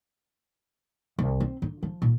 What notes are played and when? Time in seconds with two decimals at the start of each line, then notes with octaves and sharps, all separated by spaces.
1.19 C2
1.40 C4
1.62 D3
1.83 F3
2.02 A#2